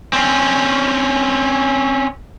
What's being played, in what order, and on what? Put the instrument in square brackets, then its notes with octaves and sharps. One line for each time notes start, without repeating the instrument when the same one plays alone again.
[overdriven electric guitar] C4 C#4